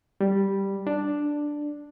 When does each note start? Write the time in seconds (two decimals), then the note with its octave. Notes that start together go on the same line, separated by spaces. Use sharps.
0.21 G3
0.87 D4